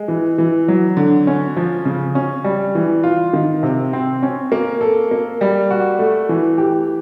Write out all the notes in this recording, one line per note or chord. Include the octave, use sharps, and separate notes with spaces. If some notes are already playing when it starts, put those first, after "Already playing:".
Already playing: G#3
E3
E3
F#3
D3
C#4
F3
C#3
C#4
G3
E3
F4
D#3
C3
C4
C#4
A#3
A4
A#3
G3
F#4
A3
E3
G4